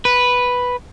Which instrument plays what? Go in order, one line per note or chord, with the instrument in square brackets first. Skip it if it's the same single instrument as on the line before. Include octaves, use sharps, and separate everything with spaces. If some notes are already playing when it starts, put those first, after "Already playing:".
[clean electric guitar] B4